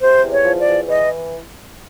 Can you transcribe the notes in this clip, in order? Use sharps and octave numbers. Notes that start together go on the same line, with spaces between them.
C3 C5
E2
C#5
F3
D5
E2
E3 D#5